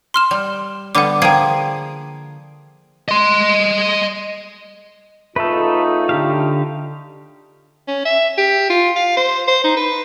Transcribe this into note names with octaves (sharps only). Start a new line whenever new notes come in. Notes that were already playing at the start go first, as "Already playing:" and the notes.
C6 F6 E7
G3
D3 G3 B3 F#5 D6
F3 A#3 G#4 G5 C7
D#5 C6
C#3 A3 D#4 F4 A4 B4
D3 G4 F5
C#4
E5
G4
F4
F5
C5
C5
D#4
B4